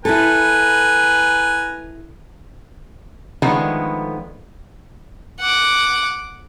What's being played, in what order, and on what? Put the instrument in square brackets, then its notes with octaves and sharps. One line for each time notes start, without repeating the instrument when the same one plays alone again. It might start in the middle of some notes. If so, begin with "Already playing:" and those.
[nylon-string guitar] E4 A4 [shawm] B4 [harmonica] G#5 A#5
[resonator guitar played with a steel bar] D3 D#3 F3 G#3 A3 B3
[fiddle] F#5 D6